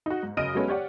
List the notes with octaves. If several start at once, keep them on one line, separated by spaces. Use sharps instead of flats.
D#4 F#4
G#2
F#2 C#3 D#5 F6 D7 D#7
F#3 G#3 A3 B3 C#4
G4 C#5 D5 F#5